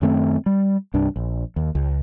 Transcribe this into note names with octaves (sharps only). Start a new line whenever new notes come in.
F#2 D#3 A3 C4
G3
C2 G2 D4
A#1
D#2
C#2